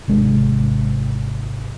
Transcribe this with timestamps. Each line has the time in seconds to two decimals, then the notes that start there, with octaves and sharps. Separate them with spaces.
0.08 G#1 C3 G#3 D4